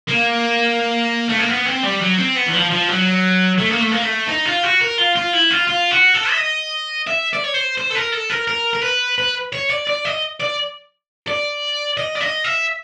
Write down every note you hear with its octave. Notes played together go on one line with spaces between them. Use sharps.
A#3
A3
A#3
B3
C4
G3
F#3
C4
B3
E3
F3
F3
F#3
A3
A#3
A3
A#3
A3
D#4
F4
F#4
A#4
F4
F4
E4
F4
F4
F#4
A4
E5
D#5
E5
D5
C#5
C5
C5
A4
A#4
A4
A#4
A#4
A#4
B4
B4
C#5
D5
D5
D#5
D5
D5
D#5
D5
D#5
E5